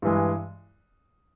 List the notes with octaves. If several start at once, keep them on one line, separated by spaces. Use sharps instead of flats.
G2 E3 G#3